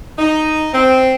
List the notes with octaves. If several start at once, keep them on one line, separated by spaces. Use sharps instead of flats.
D#4
C4